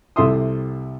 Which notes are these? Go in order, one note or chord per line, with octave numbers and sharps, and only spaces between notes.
C2 C3 A4 E5 C6 D#6